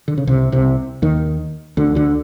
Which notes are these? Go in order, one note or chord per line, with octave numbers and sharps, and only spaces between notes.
D3
C#3
C2 C3
C2 C3
D#2 D#3
D2 D3
D2 D3